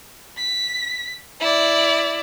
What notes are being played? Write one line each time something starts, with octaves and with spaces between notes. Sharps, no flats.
B6
E4 D5